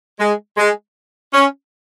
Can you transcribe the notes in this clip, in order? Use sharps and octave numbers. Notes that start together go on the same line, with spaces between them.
G#3
G#3
C#4